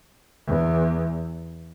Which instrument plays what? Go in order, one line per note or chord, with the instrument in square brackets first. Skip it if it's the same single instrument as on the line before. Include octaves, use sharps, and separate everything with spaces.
[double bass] E2